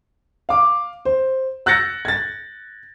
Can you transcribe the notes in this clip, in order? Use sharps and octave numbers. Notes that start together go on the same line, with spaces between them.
F5 D6
C5
E6 F#6 G6 A6 A#6 C#7
G#6 A6